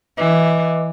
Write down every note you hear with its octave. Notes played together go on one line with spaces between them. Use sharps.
E3 B4 D#5 D6